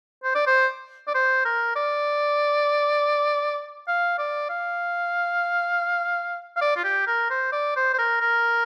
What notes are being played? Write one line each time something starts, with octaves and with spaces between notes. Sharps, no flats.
C5
D5
C5
D5
C5
A#4
D5
F5
D5
F5
F5
D5
F4
G4
A#4
C5
D5
C5
C5
A#4
A#4